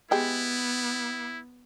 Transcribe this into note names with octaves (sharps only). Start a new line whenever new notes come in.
G#3 B3 E4 G4